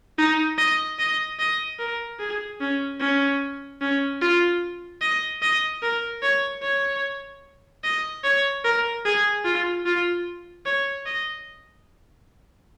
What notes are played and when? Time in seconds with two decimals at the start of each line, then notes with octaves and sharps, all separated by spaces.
0.18 D#4
0.58 D#5
0.99 D#5
1.39 D#5
1.79 A#4
2.19 G#4
2.61 C#4
3.00 C#4
3.81 C#4
4.22 F4
5.01 D#5
5.42 D#5
5.82 A#4
6.23 C#5
6.62 C#5
7.84 D#5
8.24 C#5
8.64 A#4
9.05 G#4
9.44 F4
9.86 F4
10.66 C#5
11.06 D#5